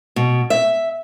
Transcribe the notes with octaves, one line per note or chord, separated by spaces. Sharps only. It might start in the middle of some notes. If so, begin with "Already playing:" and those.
B2
E5